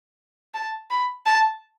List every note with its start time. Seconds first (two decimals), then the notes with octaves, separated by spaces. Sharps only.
0.54 A5
0.90 B5
1.26 A5